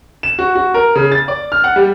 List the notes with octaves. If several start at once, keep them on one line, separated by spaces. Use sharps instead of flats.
E7
F#4
F#4
A#4
C#3
A6
D5
F6
F#5
G3